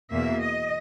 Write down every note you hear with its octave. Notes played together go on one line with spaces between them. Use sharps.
E2 B2 A#3 E5
D#5